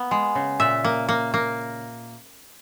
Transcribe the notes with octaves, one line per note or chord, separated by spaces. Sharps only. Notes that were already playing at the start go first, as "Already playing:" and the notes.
Already playing: A#3 B3
G#3
C#3
A#2 E5
A#3
A#3
A#3